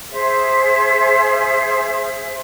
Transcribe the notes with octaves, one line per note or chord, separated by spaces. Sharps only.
G#4 C5 E5